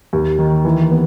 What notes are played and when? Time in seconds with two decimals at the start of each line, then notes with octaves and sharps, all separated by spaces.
0.13 D#2
0.38 D#3
0.65 E3
0.91 B3